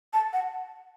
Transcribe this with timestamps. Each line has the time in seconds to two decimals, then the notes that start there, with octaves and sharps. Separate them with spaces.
0.13 A5
0.33 F#5